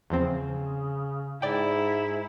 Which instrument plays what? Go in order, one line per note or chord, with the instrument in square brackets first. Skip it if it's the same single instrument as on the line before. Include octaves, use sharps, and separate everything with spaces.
[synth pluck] E2 F3 C4 [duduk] C#3
[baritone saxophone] G#2 [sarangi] E4 [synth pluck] D5 G5